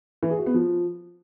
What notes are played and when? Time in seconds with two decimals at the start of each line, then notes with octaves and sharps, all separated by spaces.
0.23 E3
0.30 G#4
0.38 F#4
0.46 B3
0.54 F3